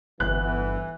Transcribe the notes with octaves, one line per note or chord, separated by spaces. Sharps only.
G1 E3 B3 F#6